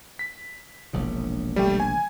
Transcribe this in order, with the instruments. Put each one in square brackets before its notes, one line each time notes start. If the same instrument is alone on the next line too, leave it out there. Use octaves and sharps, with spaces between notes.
[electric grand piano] B6
[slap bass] E1 A#1 C#3
[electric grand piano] G3 A3 G5
G#5